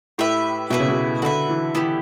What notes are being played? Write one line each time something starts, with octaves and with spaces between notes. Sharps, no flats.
A2 G4 B4 E5
B2 E4 B4 E5
C#3
B2
D3 F#4 B4 E5
E3
E3 B3 E4 G4